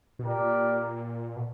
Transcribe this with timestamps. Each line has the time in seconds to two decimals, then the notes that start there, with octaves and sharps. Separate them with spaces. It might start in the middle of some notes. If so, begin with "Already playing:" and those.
0.19 B2
0.23 A#2 D4 G4 A#4 D5
1.36 B2